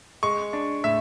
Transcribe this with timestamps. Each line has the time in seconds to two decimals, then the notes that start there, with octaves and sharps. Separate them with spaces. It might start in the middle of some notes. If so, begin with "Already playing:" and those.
0.23 G#3 C#6
0.53 D4
0.84 A2 E5